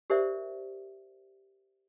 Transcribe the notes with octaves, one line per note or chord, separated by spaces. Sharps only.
G4 A#4 C5 D5 E5